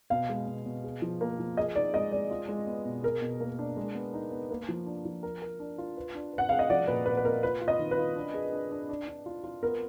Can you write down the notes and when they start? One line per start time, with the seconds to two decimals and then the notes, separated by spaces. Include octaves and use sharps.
0.10 B2 F5
0.29 G#3
0.47 B2
0.66 B2
0.84 G#4
1.02 F3
1.21 A#3
1.39 F3
1.57 G#4 D#5
1.75 D#4 D5
1.93 G#3 D#5
2.12 G#3 D5
2.31 F4
2.49 G#3
2.67 B3
2.85 B2
3.04 G#4 A#4
3.22 B2
3.40 A#3
3.59 D4
3.77 G#3
3.95 B3
4.14 D#4
4.32 B3
4.51 A#3
4.69 F3
4.86 D4
5.05 F3
5.23 A#4
5.42 A#4
5.59 D4
5.78 F4
5.97 B4
6.15 D4
6.33 B4
6.38 F#5
6.49 G#4 F5
6.59 D#5
6.70 F3 D5
6.87 A#2 B4
7.06 A#2 B4
7.17 B4
7.25 A#3 A#4
7.43 F4 B4
7.61 F4
7.68 D#5
7.79 D#3
7.91 B4
7.98 F4
8.16 D4
8.34 G#4
8.53 D4
8.71 D4
8.89 D4
9.08 D4
9.26 F4
9.44 F4
9.63 B3 A#4